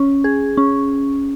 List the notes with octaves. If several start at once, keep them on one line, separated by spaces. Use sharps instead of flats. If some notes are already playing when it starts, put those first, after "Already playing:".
Already playing: C#4
G#4
C#4